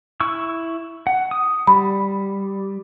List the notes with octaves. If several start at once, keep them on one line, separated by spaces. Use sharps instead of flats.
E4 C#6 E6
F#5
D#6
G3 B5